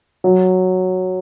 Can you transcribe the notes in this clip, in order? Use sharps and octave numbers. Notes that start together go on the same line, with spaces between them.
F#3